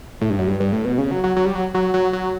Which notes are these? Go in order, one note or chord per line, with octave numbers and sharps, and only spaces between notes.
A2
G2
F#2
G2
G2
A2
B2
C#3
F#3
F#3
F#3
G3
F#3
F#3
F#3
F#3